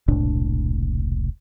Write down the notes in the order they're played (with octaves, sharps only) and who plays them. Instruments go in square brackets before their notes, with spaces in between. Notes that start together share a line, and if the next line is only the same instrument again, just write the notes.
[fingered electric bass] E1 C2 A2 D4